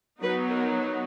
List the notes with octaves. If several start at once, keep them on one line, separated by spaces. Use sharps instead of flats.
F#3 B3 D#4 B4
A#4